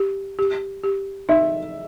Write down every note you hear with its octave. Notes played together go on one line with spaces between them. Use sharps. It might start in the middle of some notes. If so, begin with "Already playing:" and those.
Already playing: G4
G4
G4
D#4 E5